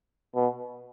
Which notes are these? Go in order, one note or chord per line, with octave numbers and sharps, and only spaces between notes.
B2